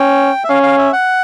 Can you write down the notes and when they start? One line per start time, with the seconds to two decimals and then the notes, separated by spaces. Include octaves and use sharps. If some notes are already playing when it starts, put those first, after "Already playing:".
Already playing: C#4 G5
0.44 E5
0.49 C#4 F5
0.63 F5
0.78 E5
0.93 F#5